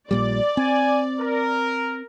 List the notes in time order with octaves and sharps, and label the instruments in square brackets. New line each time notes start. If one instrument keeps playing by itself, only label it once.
[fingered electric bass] A#1 A#2 G3 [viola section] D5
[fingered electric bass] C4 [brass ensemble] G#5
[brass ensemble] A#4